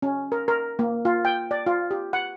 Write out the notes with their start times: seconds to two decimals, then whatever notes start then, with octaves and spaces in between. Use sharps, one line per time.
0.02 C#4
0.32 A#4
0.48 A#4
0.79 A#3
1.05 F4
1.25 G5
1.51 D5
1.66 F4
1.91 G4
2.13 F#5